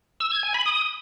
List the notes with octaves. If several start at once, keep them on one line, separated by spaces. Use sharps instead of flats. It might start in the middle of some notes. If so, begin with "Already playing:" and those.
E6
G#6
G#5
B5
D#6